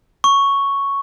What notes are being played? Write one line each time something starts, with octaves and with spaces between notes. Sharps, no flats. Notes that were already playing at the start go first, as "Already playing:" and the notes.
C#6